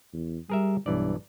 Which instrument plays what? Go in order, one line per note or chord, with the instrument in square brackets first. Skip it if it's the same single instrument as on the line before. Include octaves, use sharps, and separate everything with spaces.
[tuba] E2
[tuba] G3 [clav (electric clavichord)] G#4 A#4 E5
[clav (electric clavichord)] B1 E3 D5 [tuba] G2